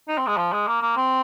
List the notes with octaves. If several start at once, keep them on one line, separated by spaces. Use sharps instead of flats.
D#4
C4
G#3
F3
G#3
A#3
A#3
C4